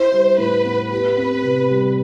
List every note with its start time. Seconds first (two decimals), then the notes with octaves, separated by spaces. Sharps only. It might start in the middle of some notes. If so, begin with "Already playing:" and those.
Already playing: E4 C5
0.12 G3
0.38 A2 B4
0.65 B3
0.91 G4 B4
1.17 C4
1.43 C3
1.69 G3